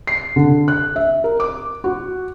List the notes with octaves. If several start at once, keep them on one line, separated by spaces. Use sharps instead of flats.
C7
D3
F#6
E5
A#4
D6
F#4